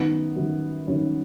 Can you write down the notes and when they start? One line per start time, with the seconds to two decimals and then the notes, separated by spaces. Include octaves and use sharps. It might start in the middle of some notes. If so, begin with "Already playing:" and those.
Already playing: F#2 D#3 B3
0.36 F#2 D#3
0.87 F#2 D#3 C#4